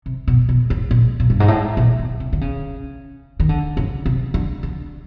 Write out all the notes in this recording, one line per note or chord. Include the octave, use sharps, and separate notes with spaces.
C3
B2
B2
A2
A#2
A#2
G2
G#2
A2
A#2
B2
C3
D3
C#3
D#3
D3
C#3
C3
D3
D3